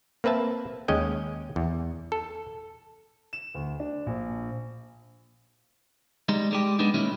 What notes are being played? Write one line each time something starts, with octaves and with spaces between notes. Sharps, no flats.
A#3 C4 B4 E5 A5
D#2 G#3 C#4 D#5 G5
E2
A4
E7
D2
D4
A#1
G3 G#3 D#4
G3 G#3 G4
G#3 B3 D4 D#4
A#2 D#3 F#3 G#3 C#4 E4